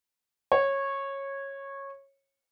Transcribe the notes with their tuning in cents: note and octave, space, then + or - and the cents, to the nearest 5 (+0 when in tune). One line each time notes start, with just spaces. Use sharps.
C#5 -15